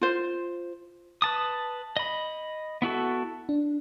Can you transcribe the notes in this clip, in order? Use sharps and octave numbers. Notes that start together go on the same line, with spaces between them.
F4 C5
B4 A5 D#6
D#5 B5
B3 E4 F#4 A4
D4